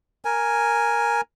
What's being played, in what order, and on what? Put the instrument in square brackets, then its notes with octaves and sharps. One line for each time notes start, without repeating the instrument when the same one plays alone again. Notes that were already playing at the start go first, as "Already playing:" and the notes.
[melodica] A#4 G#5